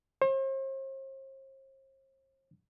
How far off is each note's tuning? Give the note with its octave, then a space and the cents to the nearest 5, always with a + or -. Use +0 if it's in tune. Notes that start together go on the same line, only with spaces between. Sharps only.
C5 +40